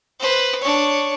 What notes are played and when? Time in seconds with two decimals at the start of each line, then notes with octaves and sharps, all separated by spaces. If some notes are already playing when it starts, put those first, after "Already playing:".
0.20 B4 C5
0.61 D4 C#5